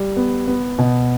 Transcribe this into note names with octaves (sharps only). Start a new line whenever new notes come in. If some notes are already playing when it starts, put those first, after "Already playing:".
Already playing: G3
B3
B3
B2